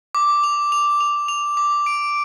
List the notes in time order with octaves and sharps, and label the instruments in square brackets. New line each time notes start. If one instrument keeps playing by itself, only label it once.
[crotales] D6
F7
F7
F7
F7
D6
D7